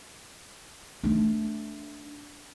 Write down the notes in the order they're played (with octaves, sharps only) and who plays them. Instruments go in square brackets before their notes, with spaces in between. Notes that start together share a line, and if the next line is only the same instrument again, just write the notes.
[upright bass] A3 D4